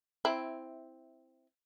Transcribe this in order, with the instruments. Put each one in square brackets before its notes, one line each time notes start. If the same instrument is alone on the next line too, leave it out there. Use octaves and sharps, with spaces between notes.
[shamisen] C4 E4